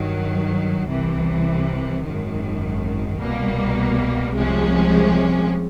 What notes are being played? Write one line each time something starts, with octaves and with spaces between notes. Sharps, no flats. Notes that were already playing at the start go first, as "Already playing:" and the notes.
Already playing: G2 D#3 F#3
C2 C3 E3
G#1 F#2 D#3
C2 B2 G3 A#3
C2 C3 F3 G#3 C#4